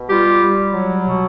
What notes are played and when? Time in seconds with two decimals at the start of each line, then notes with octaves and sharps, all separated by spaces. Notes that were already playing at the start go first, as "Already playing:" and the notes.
Already playing: B2
0.09 G3 F4 G4
0.42 G3
0.73 F#3
1.06 B2